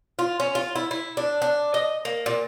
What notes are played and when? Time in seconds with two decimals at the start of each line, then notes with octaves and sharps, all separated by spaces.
0.19 F4
0.40 C#4
0.55 F4
0.75 E4
0.91 E4
1.17 D4
1.42 D4
1.74 D#5
2.05 A#3
2.26 A#2